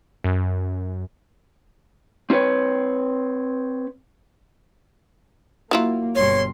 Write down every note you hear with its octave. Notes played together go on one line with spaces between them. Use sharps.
F#2
C4 E4 F4 B4 C#5
F#3 A#3 E4 F4
G1 G2 B2 C#5 C6